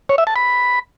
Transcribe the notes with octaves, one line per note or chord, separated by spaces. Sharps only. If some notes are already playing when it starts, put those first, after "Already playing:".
C#5
E5
A5
B5